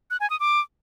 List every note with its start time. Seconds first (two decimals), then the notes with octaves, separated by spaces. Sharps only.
0.11 F#6
0.20 G#5
0.30 D#6
0.40 D6